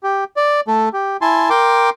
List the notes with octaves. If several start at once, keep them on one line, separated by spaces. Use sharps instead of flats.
G4
D5
A3 A4
G4
E4 G#5 A5 C6
A#4 G5 C6 D6